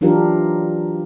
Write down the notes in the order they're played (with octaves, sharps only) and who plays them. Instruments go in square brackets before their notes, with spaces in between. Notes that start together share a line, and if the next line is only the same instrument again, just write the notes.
[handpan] E3 F#3 D4 F4 G4 A#4